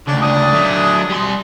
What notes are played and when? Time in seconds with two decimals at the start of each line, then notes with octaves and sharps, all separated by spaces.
0.07 D2 C#3 D4
0.21 D4 D5 D#6
0.53 F#3 A3
1.10 G3 C6